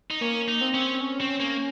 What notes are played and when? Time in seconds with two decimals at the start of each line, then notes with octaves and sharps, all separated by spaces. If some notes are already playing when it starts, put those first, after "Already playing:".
0.11 D#4
0.21 A#3 C#4
0.48 D#4
0.61 C4
0.74 C#4
1.01 C#4
1.21 C4
1.40 A#3